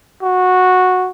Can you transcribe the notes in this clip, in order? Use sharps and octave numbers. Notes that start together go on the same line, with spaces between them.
F#4